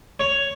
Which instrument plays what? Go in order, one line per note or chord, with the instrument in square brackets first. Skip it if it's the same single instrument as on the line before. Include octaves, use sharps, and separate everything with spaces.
[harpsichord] C#5